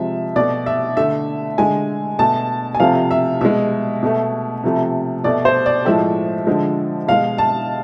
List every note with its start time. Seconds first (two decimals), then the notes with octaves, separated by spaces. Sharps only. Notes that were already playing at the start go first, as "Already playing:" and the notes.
Already playing: C3 F3 G#3 E5
0.36 B2 A3 D5
0.66 E5
0.97 D3 A3 E5
1.58 D3 G#3 G#5
2.19 B2 A3 A5
2.75 G#5
2.80 C3 F3 A3 F5
3.11 E5
3.41 B2 G#3 E5
4.03 B2 A3
4.64 C3 F3 A3
5.24 B2 A3 D5
5.45 C5
5.66 D5
5.85 A2 F3 G#3 E5
6.47 D3 F3 G#3
7.08 B2 G#3 F5
7.38 A5